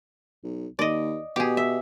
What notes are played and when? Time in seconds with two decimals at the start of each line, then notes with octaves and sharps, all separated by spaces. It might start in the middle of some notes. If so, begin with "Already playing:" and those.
0.44 B1
0.79 D#2 D5 D#5
1.36 B2 G4 G#4
1.57 E5